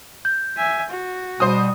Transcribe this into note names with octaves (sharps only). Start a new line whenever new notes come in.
G6
E5 G#5
F#4
B2 G3 C5 D#6